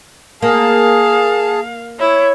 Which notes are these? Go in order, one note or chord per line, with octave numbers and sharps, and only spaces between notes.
A#3 G#4 F5 A5
E4 C#5